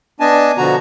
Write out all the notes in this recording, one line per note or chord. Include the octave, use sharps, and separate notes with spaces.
B3 D4 D#5 G#5 A5
B2 D3 F3 F#4 A#5